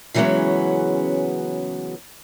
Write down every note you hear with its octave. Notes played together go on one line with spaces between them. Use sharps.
C#3 E3 F#3 G#3 B3 C#4